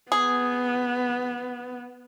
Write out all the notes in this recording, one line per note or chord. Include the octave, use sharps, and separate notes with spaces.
B3 G#4